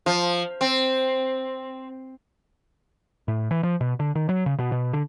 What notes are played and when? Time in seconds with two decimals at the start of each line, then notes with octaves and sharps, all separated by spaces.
0.06 F3
0.61 C4
3.28 A2
3.51 E3
3.63 F3
3.81 B2
4.00 D3
4.15 D#3
4.29 F#3
4.46 C#3
4.59 B2
4.72 B2
4.93 D3